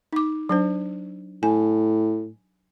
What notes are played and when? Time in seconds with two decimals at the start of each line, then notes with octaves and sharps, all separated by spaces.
0.13 D#4 D6
0.49 F#3 D4 C5
1.43 A2 G#5